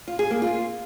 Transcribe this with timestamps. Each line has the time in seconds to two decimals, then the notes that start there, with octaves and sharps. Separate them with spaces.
0.08 F4
0.19 G#4
0.30 A#3
0.42 F4